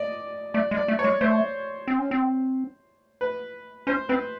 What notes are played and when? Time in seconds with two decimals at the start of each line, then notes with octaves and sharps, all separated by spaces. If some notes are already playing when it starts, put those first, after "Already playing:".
Already playing: D5 D#5
0.54 A3 D5
0.71 G#3
0.77 D5
0.88 A3
0.99 C#5
1.04 G#3
1.21 A3 C5
1.88 C4
1.99 C#4
2.11 C4
3.21 B4
3.87 C#4 C5
4.09 C4 B4